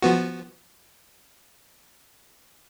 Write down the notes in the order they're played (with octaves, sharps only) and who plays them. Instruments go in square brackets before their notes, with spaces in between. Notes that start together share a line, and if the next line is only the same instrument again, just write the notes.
[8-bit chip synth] F3 B3 F#4